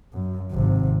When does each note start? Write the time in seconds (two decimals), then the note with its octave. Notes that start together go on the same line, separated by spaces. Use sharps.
0.13 F#2
0.52 G#1 C3